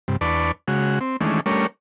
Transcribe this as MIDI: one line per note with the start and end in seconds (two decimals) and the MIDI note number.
0.08 0.16 43
0.08 0.16 48
0.21 0.52 40
0.21 0.52 62
0.21 0.52 71
0.21 0.52 74
0.21 0.52 81
0.21 0.52 85
0.68 0.99 49
0.68 0.99 56
0.68 0.99 66
1.01 1.17 60
1.21 1.40 51
1.21 1.40 52
1.21 1.40 56
1.21 1.40 57
1.21 1.40 61
1.21 1.40 62
1.46 1.67 55
1.46 1.67 57
1.46 1.67 61
1.46 1.67 62
1.46 1.67 70
1.46 1.67 73